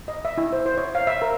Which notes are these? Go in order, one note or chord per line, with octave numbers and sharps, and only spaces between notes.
D#5
E5
E4
C5
C5
C#5
F5
E5
A#4